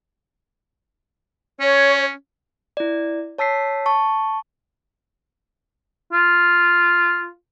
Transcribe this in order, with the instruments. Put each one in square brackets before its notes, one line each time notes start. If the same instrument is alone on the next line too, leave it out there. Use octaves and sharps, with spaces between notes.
[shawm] C#4 [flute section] C#5
[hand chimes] E4 D5
C#5 A5 E6 B6 C7
A5 C#6
[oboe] F4